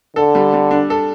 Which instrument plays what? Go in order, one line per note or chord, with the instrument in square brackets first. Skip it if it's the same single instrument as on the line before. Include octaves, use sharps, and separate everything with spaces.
[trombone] D3 [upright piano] A4
[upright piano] G3
G3
D4
A4